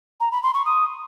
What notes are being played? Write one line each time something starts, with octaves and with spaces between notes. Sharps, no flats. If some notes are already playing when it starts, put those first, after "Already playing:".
A#5
B5
C6
C#6
D#6